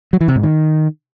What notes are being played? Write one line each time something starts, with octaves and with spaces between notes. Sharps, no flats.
F#3
E3
C3
G#2
D#3